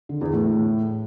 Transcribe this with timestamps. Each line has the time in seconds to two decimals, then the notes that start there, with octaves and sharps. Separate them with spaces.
0.09 D3
0.21 E2
0.33 A2